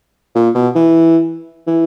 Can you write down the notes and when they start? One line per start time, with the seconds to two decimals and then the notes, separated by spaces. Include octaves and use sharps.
0.35 A#2
0.55 B2
0.76 E3
1.67 E3